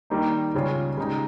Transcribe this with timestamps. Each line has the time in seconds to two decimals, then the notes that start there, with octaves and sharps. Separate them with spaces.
0.10 D#3 G3 A#3 D#4
0.54 C#2 C#3 G3 C#4 F4
0.97 C#3 G#3 D#4 G4